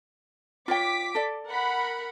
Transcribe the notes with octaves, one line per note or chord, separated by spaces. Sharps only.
F4 C#5 G5 D6 B6
A4 D5
A#4 F#5 B5